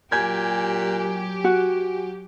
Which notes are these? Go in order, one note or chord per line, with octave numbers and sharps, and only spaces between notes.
A#2 F#3 G4 G#5 G6 G#6
F#4